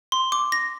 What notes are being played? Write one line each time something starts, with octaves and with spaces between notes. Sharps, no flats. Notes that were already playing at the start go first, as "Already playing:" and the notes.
C6
D6
A#6